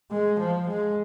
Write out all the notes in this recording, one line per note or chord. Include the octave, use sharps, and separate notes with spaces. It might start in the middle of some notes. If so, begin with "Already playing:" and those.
G#3
F3
G#3